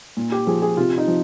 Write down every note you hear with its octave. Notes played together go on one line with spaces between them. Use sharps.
A#2
G4
F3 G#4
G#4
C3 F4
D#4
F3